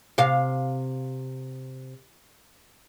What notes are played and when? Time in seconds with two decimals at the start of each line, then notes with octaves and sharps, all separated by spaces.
0.18 C3 F5